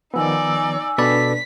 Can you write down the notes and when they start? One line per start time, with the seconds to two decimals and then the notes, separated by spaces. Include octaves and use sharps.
0.14 D#3 F3 B3 D#4 D5 G#5 E6
0.98 B2 D4 A4 B4 D5 B6